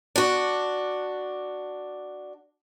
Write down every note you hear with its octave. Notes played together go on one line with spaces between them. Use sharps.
D4 F#4